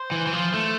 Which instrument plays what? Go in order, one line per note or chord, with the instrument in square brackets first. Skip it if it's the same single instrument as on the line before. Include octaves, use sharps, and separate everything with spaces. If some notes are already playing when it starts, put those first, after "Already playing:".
Already playing: [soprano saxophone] C5
[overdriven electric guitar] E3
E3
F3
A3